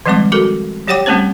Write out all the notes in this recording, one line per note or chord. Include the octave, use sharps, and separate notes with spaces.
D#3 F3 G3 G#3 C4 D6
F#4 A4 A#4
F#3 G4 C#5 F#5 G5 D6
G3 A3 A#3 C4 C#4 C5